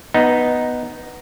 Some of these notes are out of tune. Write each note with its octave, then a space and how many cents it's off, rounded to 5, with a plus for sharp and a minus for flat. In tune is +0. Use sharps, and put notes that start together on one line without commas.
B3 +0 D#4 +0